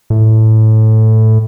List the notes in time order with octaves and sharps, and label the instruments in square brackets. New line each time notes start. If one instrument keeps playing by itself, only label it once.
[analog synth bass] A2